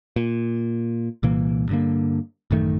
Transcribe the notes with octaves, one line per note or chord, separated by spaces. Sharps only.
A#2
C2 A#2 E3 A#3
G2 D3 A#3
A1 F#2 D#3 A3